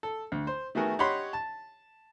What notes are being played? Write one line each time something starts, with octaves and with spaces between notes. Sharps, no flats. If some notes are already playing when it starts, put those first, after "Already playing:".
A4
D2
C5
D#3 A3 B3 F#4 G#4 A#4
G4 C#5 D#5 F#5 B5 C6
A5